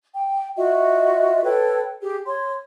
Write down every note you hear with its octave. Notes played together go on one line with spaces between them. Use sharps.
G5
F4 F#4 D#5 E5
A4 B4 C#5 G5
G4 G#4
C#5 C6